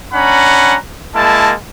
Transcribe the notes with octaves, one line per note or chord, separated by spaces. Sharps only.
C#4 D4 F#5 A#5 B5
G#3 A#3 E4 A5